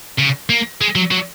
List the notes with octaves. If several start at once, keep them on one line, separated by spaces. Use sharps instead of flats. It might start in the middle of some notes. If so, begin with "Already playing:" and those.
C#3
A#3
G#3
F#3
F#3